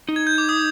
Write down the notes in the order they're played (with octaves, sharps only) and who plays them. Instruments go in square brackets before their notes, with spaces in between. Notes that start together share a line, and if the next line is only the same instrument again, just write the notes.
[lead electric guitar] D#4
[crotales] G#6
G6
D6
D#6